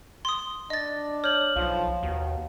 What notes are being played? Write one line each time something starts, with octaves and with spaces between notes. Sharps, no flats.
C6 D#6
D4 D#5 A6
C#5 F6 G6 F#7
B1 F3 F5
D#2 B2